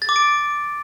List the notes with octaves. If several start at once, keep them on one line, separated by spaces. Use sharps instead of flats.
A6
D6
D7